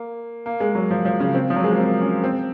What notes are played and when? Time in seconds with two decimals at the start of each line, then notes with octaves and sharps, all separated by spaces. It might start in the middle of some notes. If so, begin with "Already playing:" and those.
Already playing: A#3
0.46 A#3
0.60 G#3
0.75 F#3
0.91 F3
1.05 F3
1.20 C#3
1.35 C4
1.50 F3
1.56 F#3
1.64 G#3
1.71 A#3
1.78 C4
2.01 C#4
2.24 C4